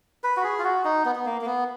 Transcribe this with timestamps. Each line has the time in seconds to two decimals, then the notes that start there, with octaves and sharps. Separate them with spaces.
0.24 B4
0.37 F#4
0.44 G#4
0.59 F4
0.64 F#4
0.85 D#4
1.05 B3
1.16 B3
1.26 A#3
1.41 A#3
1.46 B3